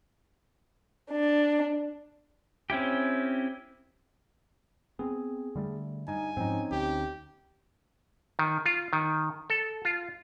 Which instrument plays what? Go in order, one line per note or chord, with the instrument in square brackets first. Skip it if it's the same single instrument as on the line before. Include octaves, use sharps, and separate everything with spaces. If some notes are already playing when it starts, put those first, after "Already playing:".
[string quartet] D4
[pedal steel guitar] C4 C#4 E4 G4
[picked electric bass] B3 C4 [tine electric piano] G#4
[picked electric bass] D3 G3 A3
[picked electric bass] G2 [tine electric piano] D#4 [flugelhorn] G#5
[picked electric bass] G#2 F3 [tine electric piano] C4 C#4 D#4
[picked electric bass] D2 [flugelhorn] G4
[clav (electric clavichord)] D#3
F4
D#3
A4
F4